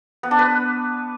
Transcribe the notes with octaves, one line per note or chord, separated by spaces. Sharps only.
B3
D4
B4